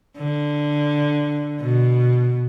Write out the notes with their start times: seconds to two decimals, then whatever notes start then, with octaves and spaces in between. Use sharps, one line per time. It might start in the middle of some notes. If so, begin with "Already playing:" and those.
0.17 D3
1.60 B2